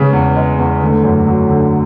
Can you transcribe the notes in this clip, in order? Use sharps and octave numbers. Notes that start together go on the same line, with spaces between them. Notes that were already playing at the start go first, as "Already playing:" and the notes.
Already playing: C#3 G#3 B3 G#4 B4
E2
G#3
E2
D3 A3 A4
F#2
F#3
D3